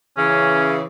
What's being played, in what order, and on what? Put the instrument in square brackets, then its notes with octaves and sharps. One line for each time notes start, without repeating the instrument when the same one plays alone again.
[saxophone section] C#3 E3 [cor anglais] C#4